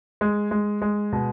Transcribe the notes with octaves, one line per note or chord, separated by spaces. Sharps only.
G#3
G#3
G#3
B2